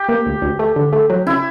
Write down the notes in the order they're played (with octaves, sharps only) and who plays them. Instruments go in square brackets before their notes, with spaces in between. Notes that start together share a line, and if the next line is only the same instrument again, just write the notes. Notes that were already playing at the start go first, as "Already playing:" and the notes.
Already playing: [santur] G4
[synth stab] A#3
D2
D2
A3
D3
A3
F#3
[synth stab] C#3 [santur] E4